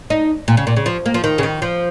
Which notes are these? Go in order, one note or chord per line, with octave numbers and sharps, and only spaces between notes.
D#4
A#2
C#3
A#2
C#3
F3
A#3
F3
D#3
C#3
D#3
F3